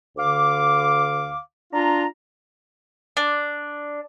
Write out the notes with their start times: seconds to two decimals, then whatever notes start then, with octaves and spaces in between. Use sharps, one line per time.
0.17 D2 D3 F5 D6
1.73 D4 F4 A#5
3.17 D4